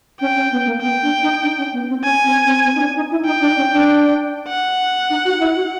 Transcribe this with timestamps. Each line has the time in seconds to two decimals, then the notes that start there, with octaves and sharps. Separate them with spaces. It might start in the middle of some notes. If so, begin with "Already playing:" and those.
0.21 C#4 G5
0.36 C#4
0.52 B3
0.66 A#3
0.81 B3 G5
1.02 D4
1.22 D#4
1.43 D4
1.57 C#4
1.73 B3
1.89 C4
2.03 C#4 G#5
2.25 C4
2.45 C4
2.65 C4
2.75 D#4
2.81 D4
2.95 D#4
3.11 E4
3.26 D#4 G5
3.41 D4
3.57 C#4
3.72 D4
4.48 F#5
5.10 D#4
5.25 F#4
5.40 E4
5.55 F#4